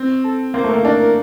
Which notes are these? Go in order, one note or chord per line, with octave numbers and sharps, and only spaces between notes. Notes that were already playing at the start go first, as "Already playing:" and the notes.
Already playing: C4
A4
A#3 C5
A3 A#4
A#3
D4 A#4
A#4